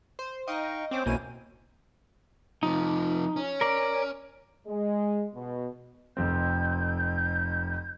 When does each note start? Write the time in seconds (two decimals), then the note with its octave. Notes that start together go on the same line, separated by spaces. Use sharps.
0.19 C5
0.48 D#4 D#5 F5 G5 C#6
0.91 C4 C#4 C5 G5 D6
1.06 B1 B2 A#3 C#4 E4 G#5 D#7
2.63 C3 F3 D#4
3.36 C#4
3.61 A#4 D5
4.67 G#3
5.34 B2
6.17 F1 F2 C4 G6